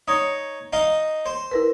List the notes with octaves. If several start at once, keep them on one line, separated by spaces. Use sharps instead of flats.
D#4 C#5 D#6
D#4 D#5 F5
C5
E4 A#4 B4